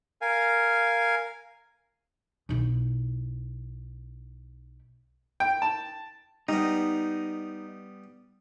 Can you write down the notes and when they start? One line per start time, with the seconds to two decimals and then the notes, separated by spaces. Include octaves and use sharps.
0.22 A#4 F5 G#5
2.49 B1 E4
5.40 G5
5.62 A5
6.49 G3 B3 D#4